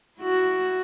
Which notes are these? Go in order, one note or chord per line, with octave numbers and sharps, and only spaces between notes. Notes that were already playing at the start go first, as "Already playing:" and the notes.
E4 F#4